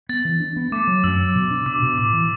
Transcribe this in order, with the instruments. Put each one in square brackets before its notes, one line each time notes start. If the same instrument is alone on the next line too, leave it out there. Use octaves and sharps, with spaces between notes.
[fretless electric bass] B3 [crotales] A6
[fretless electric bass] E3
D4
B3
[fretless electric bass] A3 [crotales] D6
[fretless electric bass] F#3
[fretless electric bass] F#2 [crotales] E6
[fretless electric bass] F#3
B2
D4
[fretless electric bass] B2 [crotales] D6
[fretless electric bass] B2
[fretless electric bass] A2 [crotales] D6
[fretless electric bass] E3